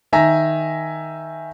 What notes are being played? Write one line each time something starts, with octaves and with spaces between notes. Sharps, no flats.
D#3 E5 G#5 A#5 A#6